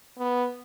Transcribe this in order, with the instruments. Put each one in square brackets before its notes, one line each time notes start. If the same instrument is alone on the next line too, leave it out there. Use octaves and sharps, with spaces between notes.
[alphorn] B3